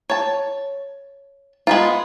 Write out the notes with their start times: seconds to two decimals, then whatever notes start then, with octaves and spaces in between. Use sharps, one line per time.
0.10 C#5 A5
1.67 G#3 B3 F4